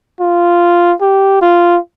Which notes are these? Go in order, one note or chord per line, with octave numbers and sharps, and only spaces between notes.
F4
G4
F4